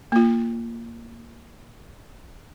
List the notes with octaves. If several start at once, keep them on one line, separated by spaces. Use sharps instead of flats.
A#3 F4